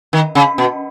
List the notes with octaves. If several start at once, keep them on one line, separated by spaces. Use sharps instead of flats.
D#3
C#3
B2